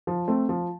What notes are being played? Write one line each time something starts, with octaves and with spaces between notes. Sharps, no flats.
F3
A3 C4
F3